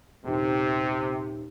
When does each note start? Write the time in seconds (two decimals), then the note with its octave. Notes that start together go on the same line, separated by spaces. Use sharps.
0.24 D#1 C3 D#3